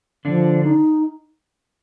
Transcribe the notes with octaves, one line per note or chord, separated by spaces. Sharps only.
D3 F3 D4
D#4